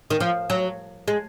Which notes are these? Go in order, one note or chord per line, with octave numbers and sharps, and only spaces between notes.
D#3
F3
F#3
G#3